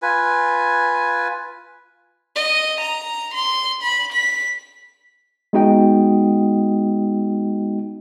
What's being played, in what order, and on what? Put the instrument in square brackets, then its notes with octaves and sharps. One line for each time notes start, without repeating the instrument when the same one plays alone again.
[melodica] F4 B4 G#5
[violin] D#5
A#5
C6
B5
B6
[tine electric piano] G#3 B3 D#4 F#4 D#5 G5